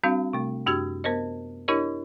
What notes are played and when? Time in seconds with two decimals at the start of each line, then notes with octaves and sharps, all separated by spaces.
0.04 G3 C4 D4 F#4 F5
0.33 C3 A3
0.66 F#2 D4 F#4 G4 E6 G#6
1.04 B3 A#4 C5 D#5
1.68 D4 E4 G4 A#4 C#5 D#5